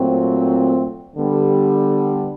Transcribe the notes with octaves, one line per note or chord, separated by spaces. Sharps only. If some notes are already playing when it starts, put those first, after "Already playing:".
Already playing: A#2 F#3 A3 C4
D3 G3 B3